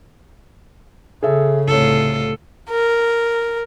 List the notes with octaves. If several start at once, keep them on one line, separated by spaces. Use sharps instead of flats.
C#3 G#4 A4 E5
C2 A2 F4 A4 C#5
A#4